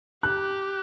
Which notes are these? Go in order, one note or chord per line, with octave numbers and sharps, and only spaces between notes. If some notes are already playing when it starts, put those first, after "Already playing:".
G4 F#6